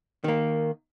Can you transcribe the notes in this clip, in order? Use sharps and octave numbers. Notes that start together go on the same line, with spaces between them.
D#3 A#3